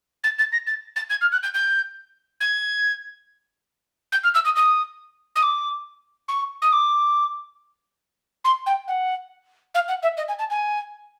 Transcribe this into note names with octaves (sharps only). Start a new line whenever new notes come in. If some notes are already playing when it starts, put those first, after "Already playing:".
A6
A6
A#6
A6
A6
G#6
F6
F#6
G6
G6
G#6
G6
F6
E6
D#6
D#6
D#6
D6
C#6
D#6
D6
C6
G5
F#5
F5
F#5
E5
D#5
G#5
A5
G#5